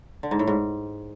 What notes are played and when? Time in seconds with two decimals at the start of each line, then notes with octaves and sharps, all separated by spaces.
0.23 D3
0.31 G#2
0.39 A2
0.47 G#2